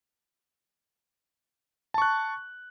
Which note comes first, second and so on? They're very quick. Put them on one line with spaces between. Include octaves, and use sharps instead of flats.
A5 C#6 F#6